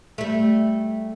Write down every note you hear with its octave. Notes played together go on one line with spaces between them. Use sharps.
G3 A3